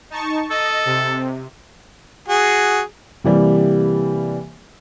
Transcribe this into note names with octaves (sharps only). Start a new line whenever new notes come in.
D#4 A5 C#6
A4 D#5
C3
F#4 G#4
C3 E3 G3 A#3